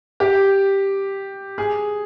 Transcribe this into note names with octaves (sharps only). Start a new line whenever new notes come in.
G4
G#4